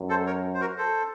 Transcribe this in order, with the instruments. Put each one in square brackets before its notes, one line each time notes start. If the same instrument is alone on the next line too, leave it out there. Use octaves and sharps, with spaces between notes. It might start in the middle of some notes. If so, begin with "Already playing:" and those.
Already playing: [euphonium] F#2
[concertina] A4 C5
A#4 C#5
C5
F#4 A#4
A4 C5